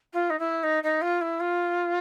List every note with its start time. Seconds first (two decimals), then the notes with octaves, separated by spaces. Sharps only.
0.13 F4
0.30 D#4
0.39 E4
0.63 D#4
0.83 D#4
1.01 F4
1.21 E4
1.40 F4